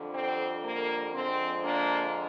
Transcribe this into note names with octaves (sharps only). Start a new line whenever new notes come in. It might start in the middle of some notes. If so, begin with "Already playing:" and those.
Already playing: F2 D3 G3
C4
A#3
F2 D3 F3 G#3 C4
A#3 D4